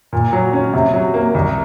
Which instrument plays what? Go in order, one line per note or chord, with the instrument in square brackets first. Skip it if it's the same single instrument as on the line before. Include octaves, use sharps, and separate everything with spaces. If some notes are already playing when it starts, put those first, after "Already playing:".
[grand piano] A#2
F#3
C#4
C3
F#3
A#3
C2